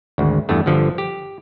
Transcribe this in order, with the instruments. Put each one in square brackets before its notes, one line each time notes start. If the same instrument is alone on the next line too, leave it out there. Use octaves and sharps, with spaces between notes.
[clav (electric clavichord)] G#1 D2
E2 G2 A3
G1 D3 F3 A4
G4